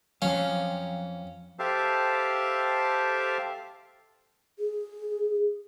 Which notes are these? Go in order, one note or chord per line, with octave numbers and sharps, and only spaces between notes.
F2 F3 F#3 C#4 F5
G4 A4 C5 E5 F5 A5
G#4